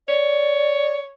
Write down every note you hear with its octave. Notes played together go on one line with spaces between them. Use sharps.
C#5 D5